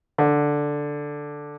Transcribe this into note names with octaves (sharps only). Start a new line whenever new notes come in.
D3